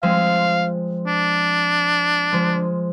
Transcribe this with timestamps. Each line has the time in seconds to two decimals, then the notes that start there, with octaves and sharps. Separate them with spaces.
0.03 F3 G#3 C4 F5
1.07 D4
2.32 F3 G#3